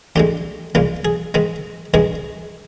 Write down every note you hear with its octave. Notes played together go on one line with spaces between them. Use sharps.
D2 D3 G#3 G4
C2 A#2 G#3 F4
G#4
G#2 D#3 G#3
G2 D#3 G#3 G#4